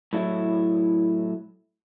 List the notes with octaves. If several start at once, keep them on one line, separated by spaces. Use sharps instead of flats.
A2 F#3 E4